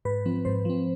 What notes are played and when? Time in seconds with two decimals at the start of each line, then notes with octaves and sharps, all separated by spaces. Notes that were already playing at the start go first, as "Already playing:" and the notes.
0.05 G#2 B4
0.25 F3 C4
0.45 G#2 C5
0.65 F3 C4